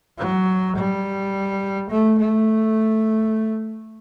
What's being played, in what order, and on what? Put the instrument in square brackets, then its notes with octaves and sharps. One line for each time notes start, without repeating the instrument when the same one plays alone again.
[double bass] F#3
G3
A3
A3